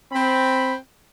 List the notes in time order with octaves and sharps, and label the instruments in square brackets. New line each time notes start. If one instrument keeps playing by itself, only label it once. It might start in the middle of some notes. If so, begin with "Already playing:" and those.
[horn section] C4 B5